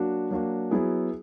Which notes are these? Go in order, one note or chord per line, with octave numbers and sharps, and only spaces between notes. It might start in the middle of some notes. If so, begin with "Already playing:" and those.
Already playing: F#3 A#3 D4 F#4
F#3 A#3 D4 F#4
F#3 B3 E4 G#4